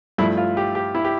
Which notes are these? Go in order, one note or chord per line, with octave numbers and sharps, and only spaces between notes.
G2 F3 A3 E4
F4
G4
G4
E4
G4